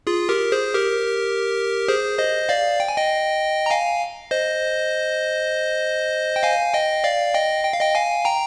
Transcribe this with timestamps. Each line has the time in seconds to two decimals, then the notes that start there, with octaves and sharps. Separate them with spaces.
0.07 F4 G#4
0.29 G4 A#4
0.52 G#4 C5
0.74 G4 A#4
1.88 G#4 C5
2.19 C5 D#5
2.49 D5 F5
2.80 G5
2.88 G#5
2.96 D#5 G5
3.66 A#5
3.70 F5 G#5
4.31 C5 D#5
6.36 G5
6.43 F5 G#5
6.74 D#5 G5
7.04 D5 F5
7.34 D#5 G5
7.64 G5
7.73 F5
7.80 D#5 G5
7.95 F5 G#5
8.25 G5 A#5